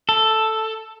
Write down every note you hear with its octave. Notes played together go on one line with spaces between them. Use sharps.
A4